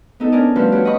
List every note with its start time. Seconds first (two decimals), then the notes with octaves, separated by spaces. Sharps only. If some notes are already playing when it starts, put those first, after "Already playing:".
0.20 B3 D#4 A4
0.32 B3 C#4 D4 A#4 D5 G#5
0.56 F3 G3 A3 F4 F#4 B4
0.72 F#4 G4 B4 C#5
0.85 D#5 F#5 B5 C#6 D#6